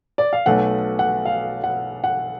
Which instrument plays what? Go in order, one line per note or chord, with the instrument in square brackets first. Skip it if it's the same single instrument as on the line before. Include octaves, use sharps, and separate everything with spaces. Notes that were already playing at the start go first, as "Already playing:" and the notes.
[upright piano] D5
F5
B1 B2 A3 F#5
F#5
F5
F#5
F#5